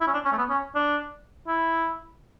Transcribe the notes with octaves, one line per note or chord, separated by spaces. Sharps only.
E4
C#4
D4
C#4
A3
B3
C#4
D4
E4